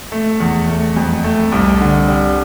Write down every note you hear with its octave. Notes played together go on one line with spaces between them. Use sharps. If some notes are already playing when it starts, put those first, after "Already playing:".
A3
E2
A3
F2
A3
C2
D3
G3